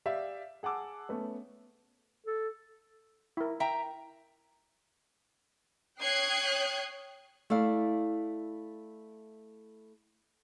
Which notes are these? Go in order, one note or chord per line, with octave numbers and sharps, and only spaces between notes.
G4 D5 E5 F5
G#4 F#5 A5 D6 E6
A3 B3 C#4
A4
E4 A#4
E5 G5 A#5
C#5 G5 D#6 F#6 G#6 C7
A3 E4 D5 F5